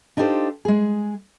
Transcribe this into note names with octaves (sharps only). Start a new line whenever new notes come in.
D4 D#4 F4 G4 A4 C5
G#3 G#4